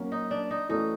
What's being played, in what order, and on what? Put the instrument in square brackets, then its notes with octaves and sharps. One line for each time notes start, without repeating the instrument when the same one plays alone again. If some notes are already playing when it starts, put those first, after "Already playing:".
Already playing: [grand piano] F#3 A#3 C#4
[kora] D#4
D4
D#4
[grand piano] E3 A3 C#4 F#4 A4 [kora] D#4